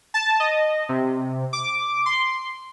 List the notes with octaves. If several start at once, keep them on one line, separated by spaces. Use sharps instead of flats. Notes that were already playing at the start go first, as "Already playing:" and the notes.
A5
D#5
C3
D6
C6